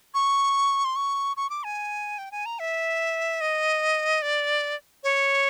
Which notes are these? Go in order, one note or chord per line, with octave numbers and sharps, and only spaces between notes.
C#6
C6
C#6
C#6
D6
G#5
G5
G#5
A#5
E5
D#5
D5
C#5